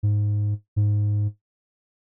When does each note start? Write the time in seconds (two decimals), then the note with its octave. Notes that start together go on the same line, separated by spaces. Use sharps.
0.03 G#2
0.76 G#2